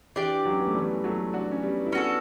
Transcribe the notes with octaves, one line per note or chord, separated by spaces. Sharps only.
E3 D4 G4 D5
F#3
C#4
B3
A3
E3 G3
F#3 A3
D4 F#4
C#4
G3 B3
E4
B3 C#4 D4 F#4 A4